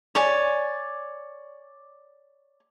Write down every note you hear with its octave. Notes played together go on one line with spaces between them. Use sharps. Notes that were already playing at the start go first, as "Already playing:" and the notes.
C#5 D5 G#5